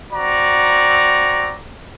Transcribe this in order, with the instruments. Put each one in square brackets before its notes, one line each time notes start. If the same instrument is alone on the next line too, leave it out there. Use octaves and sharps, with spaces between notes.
[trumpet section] C4 F#4 D5 A#5